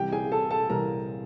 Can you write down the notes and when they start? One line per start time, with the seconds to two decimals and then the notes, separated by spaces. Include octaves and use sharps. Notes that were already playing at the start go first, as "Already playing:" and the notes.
Already playing: C2 C3 E3 G4 G5
0.12 G#4 G#5
0.32 A4 A5
0.51 A4 A5
0.69 C2 C3 E3 A#4 A#5